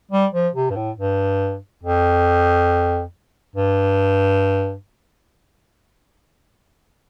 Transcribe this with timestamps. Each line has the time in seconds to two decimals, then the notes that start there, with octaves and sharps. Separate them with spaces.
0.11 G3
0.33 F3
0.55 C3
0.70 G2
0.76 A2
0.97 G2
1.83 F2
3.55 G2